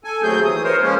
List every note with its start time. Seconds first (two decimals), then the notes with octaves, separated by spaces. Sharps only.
0.04 A4 G#5
0.23 D#2 F#3 A3 C4 G#4 G6
0.45 E3 D#6
0.64 A#4 C5 C#5
0.82 F3 G#3 A#3 C#4